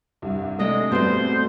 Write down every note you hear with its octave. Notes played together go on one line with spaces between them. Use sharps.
C2 G2
C3 G#3 A3 D4 D#5
B2 G3 B3 C4 C5